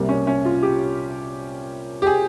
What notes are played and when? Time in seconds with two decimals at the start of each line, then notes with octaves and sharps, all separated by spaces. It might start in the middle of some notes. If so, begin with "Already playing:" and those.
Already playing: C2 C3 G3 A#3
0.09 C#4
0.27 C#4
0.45 F4
0.62 G4
2.02 G4
2.07 G#4